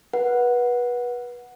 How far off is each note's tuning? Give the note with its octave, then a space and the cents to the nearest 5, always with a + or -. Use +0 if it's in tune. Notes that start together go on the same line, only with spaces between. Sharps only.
B4 -25 F#5 -5